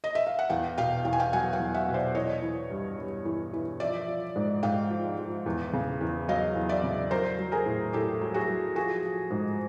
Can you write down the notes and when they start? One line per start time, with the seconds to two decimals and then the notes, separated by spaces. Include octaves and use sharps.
0.04 D#5
0.15 E5
0.27 F5
0.39 F#5
0.49 E2 F5 G5
0.78 B2 F5 G5
1.05 E2 G5
1.13 G#5
1.20 F5 G5
1.33 F#3 F#5 G#5
1.53 F5 G5
1.60 E2
1.74 E5 F#5
1.88 B2
1.94 C5 D5
2.15 E3 C#5 D#5
2.42 E3
2.70 G2
2.98 G2
3.25 E3
3.53 E3
3.80 F3 D5 E5
4.08 F3
4.36 G#2
4.63 G#2 F5 G5
4.90 F3
5.18 F3
5.46 E2
5.73 C#3
6.01 E2
6.28 F#3 D#5 F5
6.56 E2
6.69 D5 E5
6.84 C#3
7.11 F#3 A#4 C5
7.39 F#3
7.52 G#4 A#4
7.66 A2
7.93 A2 G4 A4
8.21 F#3
8.34 F#4 G#4
8.49 F#3
8.76 F3 F#4 G#4
9.03 F3
9.31 G#2